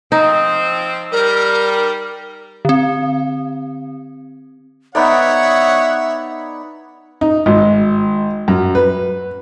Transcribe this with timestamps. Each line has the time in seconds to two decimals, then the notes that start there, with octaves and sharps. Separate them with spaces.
0.12 F3 C4 D#4
1.12 G3 A#4
2.65 D3 C4
4.95 B3 D#4 C#5 D5 E5 F#5
7.21 D#4
7.46 G#1
8.48 F#2
8.75 B4